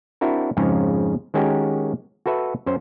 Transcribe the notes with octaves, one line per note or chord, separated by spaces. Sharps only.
C4 D4 E4 F#4 A#4
F2 G#2 C#3 F3 C#4 A#5
D#3 G#3 C#4 F#4 G4 A#4
F#4 A4 B4 E5
F#2 C#4 C5